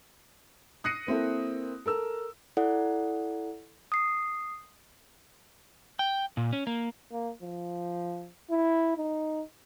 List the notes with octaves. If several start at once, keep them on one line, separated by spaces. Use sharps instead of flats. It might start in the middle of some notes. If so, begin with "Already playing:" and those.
D#6 F#6 A#6 C7 C#7 D#7
A#3 C4 E4 A4
A4 A#4 E6
E4 A4 D5 F#5
D#6 C7
G5
A#2
C#4
A#3
A#3
F3
E4
D#4